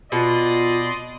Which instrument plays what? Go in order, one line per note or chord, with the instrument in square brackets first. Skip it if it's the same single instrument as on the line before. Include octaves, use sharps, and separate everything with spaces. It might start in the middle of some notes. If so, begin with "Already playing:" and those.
[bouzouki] B2 [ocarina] F4 [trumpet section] D5 D#5 C6